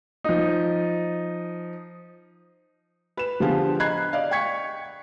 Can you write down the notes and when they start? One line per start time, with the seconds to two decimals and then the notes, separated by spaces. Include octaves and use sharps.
0.24 F3 D#4
3.17 B4 E7
3.40 D3 F3 B3 F4 G4 G#4
3.80 D#5 A#5 B5 F#6 G#6 C7
4.13 D5 D#5 F5
4.31 G5 C#6 G#6 B6 C#7